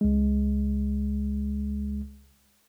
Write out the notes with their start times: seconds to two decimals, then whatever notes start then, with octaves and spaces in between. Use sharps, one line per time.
0.01 C#2 G#3